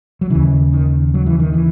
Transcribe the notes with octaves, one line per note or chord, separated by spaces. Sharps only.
F#3
D#2 C#3 E3
D#3
F#3
E3
D#3
E3